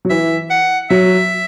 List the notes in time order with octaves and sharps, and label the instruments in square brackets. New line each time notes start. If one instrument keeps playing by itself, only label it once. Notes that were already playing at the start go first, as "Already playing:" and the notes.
[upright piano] F#3
[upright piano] E3 [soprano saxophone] E5
[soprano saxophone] F#5
[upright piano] F#3 [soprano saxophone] E5